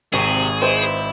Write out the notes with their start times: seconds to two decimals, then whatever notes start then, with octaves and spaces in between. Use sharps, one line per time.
0.13 G#1 C3 C4 G4 G#4 C#6
0.61 E4 B4 C5 D#5